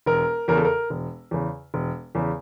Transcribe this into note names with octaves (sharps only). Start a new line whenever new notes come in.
E1 A#4
E2 C#3 A#4
A4
A#4
E1
E2 C#3
E1
E2 C#3